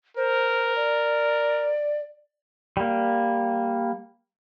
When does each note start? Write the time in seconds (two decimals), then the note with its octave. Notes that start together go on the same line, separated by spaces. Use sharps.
0.17 A#4 C5
0.76 D5
2.77 G3 A#3